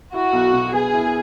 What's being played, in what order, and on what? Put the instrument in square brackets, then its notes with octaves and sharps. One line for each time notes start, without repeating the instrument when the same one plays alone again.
[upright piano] E4 [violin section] F#4
[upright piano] B1
B2
[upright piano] B3 [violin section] G#4
[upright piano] E4